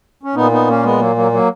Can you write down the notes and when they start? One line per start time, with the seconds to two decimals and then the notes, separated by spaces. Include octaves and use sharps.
0.23 C#4
0.35 A#2 B3 D#4
0.51 B3 D#4
0.67 A#3 C#4
0.83 G#3 B3
0.99 F#3 A#3
1.16 F#3 A#3
1.32 F#3 A#3